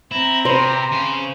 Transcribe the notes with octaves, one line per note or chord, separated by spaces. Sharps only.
C4 E4 A#5
C3 C5 B5
C#3 G#5